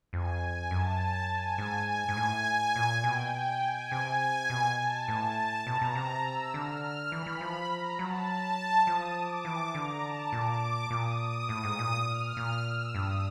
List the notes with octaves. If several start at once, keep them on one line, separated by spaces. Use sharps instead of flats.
F2 G#5
G#5
F#2 A5
G#5
G#2
G#5
G#2
A2
A#2
B2 G5
G5
G#5
C3
B2
A5
A2 A5
B2 A#5
B2
C3
E6
D3 F6
F6
E3 B5
E3
F3 B5
A#5
F#3 A5
F3 D#6
D6
E3
D3 A#5
A5
A#2 D6
A#2 D#6
D#6
A2
G#2
A#2
F6
A#2
E6
G2 D#6